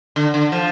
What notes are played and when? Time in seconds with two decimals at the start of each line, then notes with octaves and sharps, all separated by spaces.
0.16 D3
0.34 D3
0.52 F3